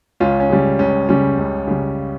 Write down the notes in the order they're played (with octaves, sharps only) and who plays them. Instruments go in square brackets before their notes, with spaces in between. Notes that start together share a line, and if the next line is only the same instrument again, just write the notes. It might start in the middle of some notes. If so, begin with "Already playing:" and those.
[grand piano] C#2 C#4 F4
C#4
C#3 G3
C#2 C#4
C#3 G3 C#4
C#2
C#3 G3